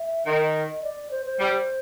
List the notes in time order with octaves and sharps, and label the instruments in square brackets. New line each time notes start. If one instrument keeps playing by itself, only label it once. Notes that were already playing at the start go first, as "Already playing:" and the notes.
Already playing: [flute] E5
[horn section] D#3 [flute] D#5
[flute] D5
C5
C5
[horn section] G3